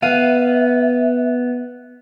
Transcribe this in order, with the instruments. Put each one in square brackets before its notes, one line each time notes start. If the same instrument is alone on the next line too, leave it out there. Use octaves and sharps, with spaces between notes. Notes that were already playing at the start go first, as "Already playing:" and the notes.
[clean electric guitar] B3 [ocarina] E5 [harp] F5 D#7